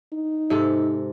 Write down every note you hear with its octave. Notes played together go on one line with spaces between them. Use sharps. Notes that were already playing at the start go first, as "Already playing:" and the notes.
D#4
G#2 C3 A4